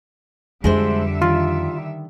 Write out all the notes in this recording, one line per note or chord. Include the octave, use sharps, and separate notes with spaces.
F2 D3 G3 G#3 D4 C5 E5
D#3 F4